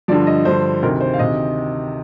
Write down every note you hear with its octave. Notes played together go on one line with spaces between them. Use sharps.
G2 D3 F3 D5
D#5
G2 D3 F3 C5
D2 C3 D#3 A#4
C5
F5
D2 C3 D#3 D#5